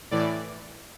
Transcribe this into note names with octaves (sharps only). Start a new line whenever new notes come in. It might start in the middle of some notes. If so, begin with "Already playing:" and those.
A2 E3 D5